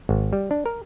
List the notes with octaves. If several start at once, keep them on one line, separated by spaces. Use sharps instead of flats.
G#1
G3
D4
A#4